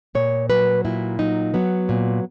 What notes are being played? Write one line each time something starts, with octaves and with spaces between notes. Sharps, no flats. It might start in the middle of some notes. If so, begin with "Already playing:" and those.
A#2 C#5
F#3 B4
A#2 E4
F#3 D#4
F#3 B3
A#2